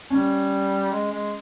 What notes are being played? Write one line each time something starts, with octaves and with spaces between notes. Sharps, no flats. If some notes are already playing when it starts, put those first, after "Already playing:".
G3 C#4
G#3
G#3